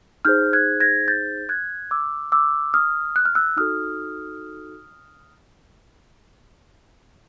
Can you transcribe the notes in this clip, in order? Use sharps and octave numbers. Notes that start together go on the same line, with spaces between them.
D#4 G#4 C5 F6 G6
F#6 G#6
G#6 A#6
G6 A6
F#6 G#6
D6 E6
D6 E6
D#6 F6
F#6
F6
E6 F#6
D#4 F#4 A4 D#6 F6